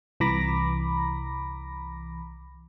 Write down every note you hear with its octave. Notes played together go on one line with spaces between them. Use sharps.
C2 E3 A#5 B5 D6 A#6